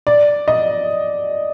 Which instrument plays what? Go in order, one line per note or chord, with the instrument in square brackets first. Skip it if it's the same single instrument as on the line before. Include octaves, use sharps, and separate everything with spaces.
[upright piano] D5
D#5